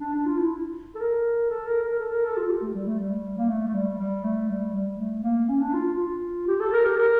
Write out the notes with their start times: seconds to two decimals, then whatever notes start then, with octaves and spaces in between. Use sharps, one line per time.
0.01 D4
0.13 D4
0.26 F4
0.38 E4
0.95 A4
1.00 A#4
1.50 A4
1.67 A#4
1.84 A#4
2.00 A4
2.12 A#4
2.25 A4
2.37 F4
2.49 G4
2.62 A3
2.75 G3
2.87 A3
2.99 G3
3.38 A#3
3.49 A3
3.68 A3
3.74 G3
3.98 G3
4.24 A3
4.49 G3
4.74 G3
4.98 A3
5.23 A#3
5.48 C#4
5.61 D4
5.74 F4
5.85 F4
5.98 F4
6.48 G4
6.60 A4
6.73 A#4
6.85 G4
6.97 A#4